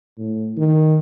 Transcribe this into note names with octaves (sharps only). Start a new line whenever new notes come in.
A2
D#3